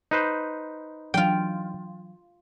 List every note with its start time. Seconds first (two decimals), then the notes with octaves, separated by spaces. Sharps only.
0.11 D#4 B4 C5
1.14 E3 F#3 D4 F4 G5